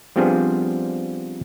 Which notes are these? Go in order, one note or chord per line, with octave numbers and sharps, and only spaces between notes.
F3 G3 B3 C4 D4 G#4